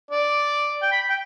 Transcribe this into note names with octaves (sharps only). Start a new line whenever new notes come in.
D5
G5
B5
G5